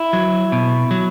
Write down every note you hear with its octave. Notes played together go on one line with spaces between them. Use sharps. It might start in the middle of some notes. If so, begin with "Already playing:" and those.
Already playing: E4
F#3
B2
F#3